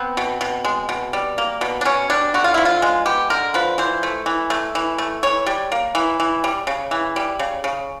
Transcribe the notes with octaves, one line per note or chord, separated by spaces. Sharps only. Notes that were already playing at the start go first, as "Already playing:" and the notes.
Already playing: B3 C4
B2
B2
G#3
B2
G3
A#3
B2
D4
B2 C#4
G3 D4
D3 F#4
F4
F3 E4
F4
G#3
B3 G4
D3 A#4
F3 B4
E3 C5
A3
E3
A3
E3
A3
E3 C#5
G3
A#3
E3
E3
G3
C#3
E3
G3
C#3
C#3